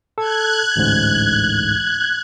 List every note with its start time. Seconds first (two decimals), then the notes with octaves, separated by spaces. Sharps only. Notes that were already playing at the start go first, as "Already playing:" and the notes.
0.18 A4 F#6 G#6
0.76 A1 D2 G#2